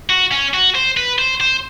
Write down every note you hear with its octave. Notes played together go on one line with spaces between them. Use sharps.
F#4
C#4
F#4
C5
B4
C5
C5